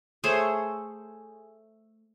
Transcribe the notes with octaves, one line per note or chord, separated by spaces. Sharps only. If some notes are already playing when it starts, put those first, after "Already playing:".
A3 G#4 C5 C#5